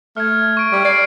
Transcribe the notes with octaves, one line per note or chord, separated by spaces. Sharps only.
A3 F6 G#6
C#6 D7
G3
D5 G#6 C7 D7